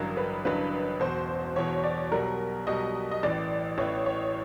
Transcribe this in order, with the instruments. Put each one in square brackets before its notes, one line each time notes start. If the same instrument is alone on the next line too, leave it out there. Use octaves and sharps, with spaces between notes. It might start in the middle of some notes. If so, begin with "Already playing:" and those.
Already playing: [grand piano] A1 G2 D3 F#3 [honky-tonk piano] A#4
[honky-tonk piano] B4
[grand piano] A1 G2 D3 F#3 [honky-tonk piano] B4
[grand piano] E1 E2 B2 [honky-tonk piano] C5
[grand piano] E1 E2 B2 [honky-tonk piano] C#5
[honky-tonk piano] D5
[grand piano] B1 B2 G3 [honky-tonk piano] A#4
[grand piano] B1 B2 G3 [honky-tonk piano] D#5
[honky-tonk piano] D#5
[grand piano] A1 A2 E3 [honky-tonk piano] D5
[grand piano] A1 A2 E3 [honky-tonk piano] C#5
[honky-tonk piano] C#5